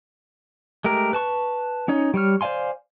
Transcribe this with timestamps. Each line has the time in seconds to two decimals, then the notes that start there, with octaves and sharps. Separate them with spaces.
0.84 G#3 A3 G4 A#4
1.13 B4 A5 C#6
1.88 C#4 D#4 C#5
2.14 G3 C#5 F6
2.41 C5 D5 F5 G#5 C6